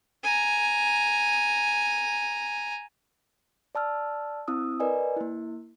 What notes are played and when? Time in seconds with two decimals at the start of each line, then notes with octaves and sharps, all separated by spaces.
0.24 G#5 A#5
3.75 D5 A5 E6 F6
4.48 C4 E4 D#6 E6
4.80 A#4 B4 D5 D#5 G#5
5.17 A#3 E4